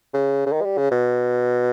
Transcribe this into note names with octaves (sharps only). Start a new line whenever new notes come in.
C#3
C#3
D#3
G#3
G3
C#3
B2